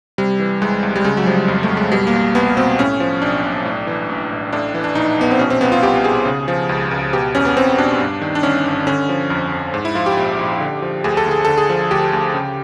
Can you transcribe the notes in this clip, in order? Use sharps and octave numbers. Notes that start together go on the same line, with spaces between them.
C3 G3
E3
C2 G#3
C2
G3
C#3 G#3
F#3
F3 G3
F2
A3
F2
G#3
B2 G3
A#3
C2
C2 B3
B2 C4
A2 C#4
F3
B1 D4
B1
A2
E3
A1
A1
A2 D4
E3
D4
A#1 D#4
A#1 B3
C4
B2 C#4
C4
C2 B3
F4
C2 G4
B2 G#4
C#3
F3
C#2
C#2
B2 G4
E2 C#4
B3
E2 C4
B2 D4
G2
D#3
D4
G1 C#4
G1
D3 C#4
F3
F2
F2
G#2
E4
F3 F4
G4
A#1
A#1
D3
F3
D2 G#4
A4
D2
G#4
D3 A4
G#4
F3
D2 G4
D2
C#3